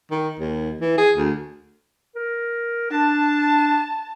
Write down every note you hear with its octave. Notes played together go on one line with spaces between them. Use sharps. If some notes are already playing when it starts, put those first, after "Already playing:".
D#3
D#2
E3
G#4
D2
A#4
D4 A5